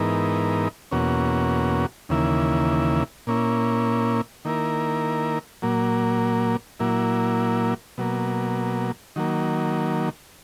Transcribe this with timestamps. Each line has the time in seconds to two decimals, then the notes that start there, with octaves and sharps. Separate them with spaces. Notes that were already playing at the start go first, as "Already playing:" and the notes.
Already playing: G#2 E3 B3 D#4 A#4
0.91 E2 B2 A#3 C#4 F#4
2.09 D#2 C#3 E3 A#3 E4
3.27 A#2 A#3 C#4 E4
4.45 D#3 A#3 E4 A#4
5.62 A#2 F#3 A#3
6.80 A#2 F#3 A#3 E4
7.98 B2 F#3 A#3
9.16 D#3 F#3 A#3